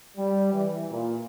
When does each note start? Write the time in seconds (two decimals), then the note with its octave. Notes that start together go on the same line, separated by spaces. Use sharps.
0.17 G3
0.53 E3
0.91 A#2